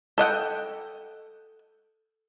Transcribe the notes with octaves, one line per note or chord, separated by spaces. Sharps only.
A4 D#5 F#5 G5